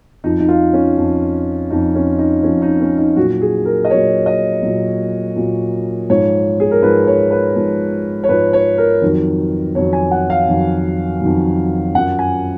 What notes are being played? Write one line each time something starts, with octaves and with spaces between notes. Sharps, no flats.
F2 F3 D#4
D#4
F4
C#4
F2 F3
F2 F3 D#4
C#4
D#4
F2 F3 C#4
D#4
C#4
D#4
A#2 F#3 F#4
G#4
A#4
D#5
A#2 F#3 C#5
D#5
A#2 F#3
A#2 F#3
G#2 F3 C#5
G#4
A#4
G#2 F3 B4
C#5
B4
G#2 F3
C#5
G#2 F3 B4
C#5
A#4
F2 D#3 F#3
F2 D#3 F#3 C#5
G#5
F#5
F5
F2 D#3 F#3
F2 D#3 F#3
F#2 F3 F#5
G#5